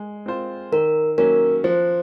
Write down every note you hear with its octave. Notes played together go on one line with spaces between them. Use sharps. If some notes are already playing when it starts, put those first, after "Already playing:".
Already playing: G#3
C4 F4 C5
D#3 A#4
F#3 A#3 C#4 A#4
F3 C5